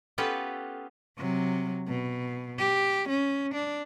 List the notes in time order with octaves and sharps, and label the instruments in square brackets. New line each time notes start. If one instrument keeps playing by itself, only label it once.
[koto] B3 C#4 F4 G4 A4 B4
[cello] C3 F#3
B2
G4
C#4
D4